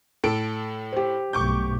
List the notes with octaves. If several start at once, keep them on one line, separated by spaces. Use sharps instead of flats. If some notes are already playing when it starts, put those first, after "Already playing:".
A2 A4 D7
G4 C5
B1 G2 A3 C#6 D6 G6